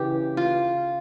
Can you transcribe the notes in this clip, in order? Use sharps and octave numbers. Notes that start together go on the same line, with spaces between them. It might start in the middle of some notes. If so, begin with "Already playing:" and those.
Already playing: C#3 E3 G4
F4